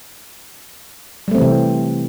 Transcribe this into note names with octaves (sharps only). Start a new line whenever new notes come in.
C3 E3 G3 A3 C4